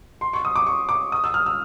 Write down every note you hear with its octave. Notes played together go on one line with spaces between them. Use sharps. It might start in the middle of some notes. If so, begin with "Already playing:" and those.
C6
C#6
D#6
D6
C#6
D6
D#6
E6
F6
E6